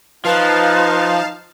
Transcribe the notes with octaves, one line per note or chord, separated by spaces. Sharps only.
F3 D#4 B4 F5 A5